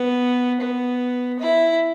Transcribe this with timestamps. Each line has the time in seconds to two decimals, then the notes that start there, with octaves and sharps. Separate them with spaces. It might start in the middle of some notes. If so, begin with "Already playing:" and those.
Already playing: B3
0.60 B3
1.39 E4